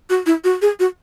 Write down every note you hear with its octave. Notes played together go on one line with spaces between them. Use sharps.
F#4
E4
F#4
G#4
F#4